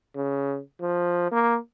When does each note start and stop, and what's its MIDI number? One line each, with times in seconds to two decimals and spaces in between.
0.15 0.59 49
0.81 1.30 53
1.32 1.58 58